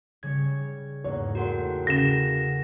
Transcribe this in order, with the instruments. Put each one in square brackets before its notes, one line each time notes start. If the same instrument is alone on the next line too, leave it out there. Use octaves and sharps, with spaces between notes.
[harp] C#3 G3 C#5 [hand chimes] G#6
[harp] E2 G#2 A#3 [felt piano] C#5
[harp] A3 G5 C6 [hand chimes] F#4 A#4 F#5
[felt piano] C#3 [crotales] A#6 E7